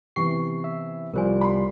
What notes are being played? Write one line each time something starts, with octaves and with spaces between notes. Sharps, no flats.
C3 E3 B3 G4 G5 C#6 C7
E5
C2 F3 G3 F4 A#4 C5 G#5
B5 C6